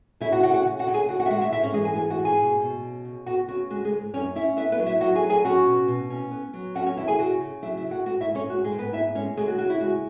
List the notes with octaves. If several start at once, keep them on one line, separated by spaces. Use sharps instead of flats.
C#3 E4 E5
F#4 F#5
C#3 F#4 F#5
F#4 F#5
C#3
F#4 F#5
C#3
G#4 G#5
C#3 F#4 F#5
F#4 F#5
E5
G#3 F#4 F#5
E4 E5
G#2 E4 E5
C#4 C#5
E3 G#3 G#4
G#4 G#5
G#2 G#4 G#5
F#4 F#5
G#2
G#4 G#5
B2
B2
C#3
C#3
B3 F#4 F#5
C#3 F#4
G#3 F#4
G#3 G#4
G#2
F#2 C#4 C#5
C#4 E4 E5
B3 E4 E5
B3 B4
F#3
E4 E5
F#3 F#4 F#5
G#4 G#5
F#3
G#4 G#5
C#4 F#4 F#5
B2
B2
C#4
B3
F#3
C#4 F#4 F#5
C#4 C#5
E2 E4 E5
G#4 G#5
C#3 F#4 F#5
C#3
F#3 E4 E5
E4 E5
C#3
F#4 F#5
G#2 F#4 F#5
E4 E5
G#3
C#4 C#5
G#2 F#4
G#3 G#4
G#2
B3 B4
B3 E4 E5
G#3 C#4 C#5
C#3 G#3 G#4
F#4
C#3 F#4
E4
G#3 F#4